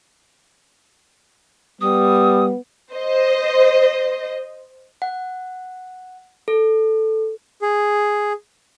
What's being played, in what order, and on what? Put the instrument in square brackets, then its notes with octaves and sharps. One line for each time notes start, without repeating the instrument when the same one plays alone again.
[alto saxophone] G3 [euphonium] B3 [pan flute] D#6
[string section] C5 D#5
[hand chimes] F#5
A4
[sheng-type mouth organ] G#4